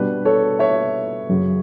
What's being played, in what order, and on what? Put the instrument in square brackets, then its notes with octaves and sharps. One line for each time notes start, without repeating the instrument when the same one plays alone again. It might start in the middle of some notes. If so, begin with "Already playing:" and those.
Already playing: [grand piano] B2 G3 D4 G4 B4
A4 C#5
C#5 E5
F#2 C#3 F#3